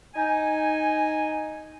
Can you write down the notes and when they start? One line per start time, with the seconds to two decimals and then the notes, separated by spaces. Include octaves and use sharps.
0.14 D#4 G#5